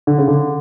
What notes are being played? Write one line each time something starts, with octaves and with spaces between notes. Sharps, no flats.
D3
C#3
D3